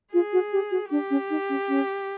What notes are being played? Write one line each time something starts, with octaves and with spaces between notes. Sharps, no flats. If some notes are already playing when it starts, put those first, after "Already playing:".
F4 G#4
F#4
G4
F#4
D4 G4
C#4
D#4
C#4
C#4